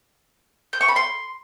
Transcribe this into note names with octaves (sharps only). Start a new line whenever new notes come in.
G6
C#6
B5
C6